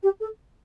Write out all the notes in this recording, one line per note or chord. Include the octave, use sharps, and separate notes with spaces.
G4
A4